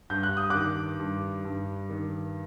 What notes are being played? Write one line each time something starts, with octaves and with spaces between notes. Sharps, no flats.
G2 G6
F#6
D#6
D#3 D6 F#6
G2
G2
D#3